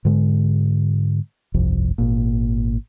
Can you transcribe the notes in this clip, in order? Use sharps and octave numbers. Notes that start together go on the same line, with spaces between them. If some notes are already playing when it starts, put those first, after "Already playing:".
G#2 D3 G#3
G1 C2 F2
G#1 A#2